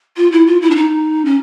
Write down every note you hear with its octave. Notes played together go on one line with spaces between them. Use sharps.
F4
E4
F4
E4
D4
D#4
C#4